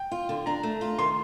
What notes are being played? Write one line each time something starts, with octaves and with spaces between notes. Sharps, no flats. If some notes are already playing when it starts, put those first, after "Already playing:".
Already playing: G5
F4
D3
D4 A#5
A3
F4
D#3 C6